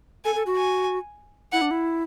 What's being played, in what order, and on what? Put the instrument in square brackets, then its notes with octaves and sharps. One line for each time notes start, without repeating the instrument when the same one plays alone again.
[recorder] A4 [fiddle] G#5
[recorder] A4
F#4
[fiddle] G#5
[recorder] E4 [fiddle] F#5
[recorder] D4
E4